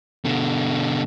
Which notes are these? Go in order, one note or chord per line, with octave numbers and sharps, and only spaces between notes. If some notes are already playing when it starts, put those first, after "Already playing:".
B2 D3